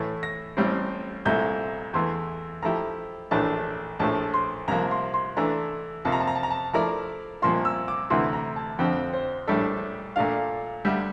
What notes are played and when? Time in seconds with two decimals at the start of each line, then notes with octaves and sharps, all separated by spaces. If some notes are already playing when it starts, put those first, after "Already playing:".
Already playing: A2 E3 A3 E4
0.23 A#6
0.57 A1 A2 G3 C4
1.25 C2 A#2 A3 E4 G6
1.93 E2 E3 A3 C6
2.63 F3 A3 E4 G4 A#5
3.31 A#1 A2 E3 A3 D4 A5
3.99 A#1 A2 F3 A3 A5
4.34 C6
4.68 C2 C3 F3 A#3 A#5
4.91 C6
5.14 C6
5.37 E3 A3 D4 A#5
6.05 F2 C3 F3 A#3 A5
6.12 A#5
6.20 A5
6.27 A#5
6.35 A5
6.43 A#5
6.50 A5
6.73 F3 A3 E4 A#4 D5 A#5
7.42 C2 A#2 F3 A#3 F4 C6
7.65 E6
7.88 D6
8.10 D2 C3 E3 A3 E4 C6
8.33 A#5
8.56 A5
8.79 F2 D3 F3 C4 G5
9.13 C5
9.47 A#1 A2 G3 D4 A4 E5
10.16 A#2 A3 D4 F4 F5
10.85 D2 D3 G3 E5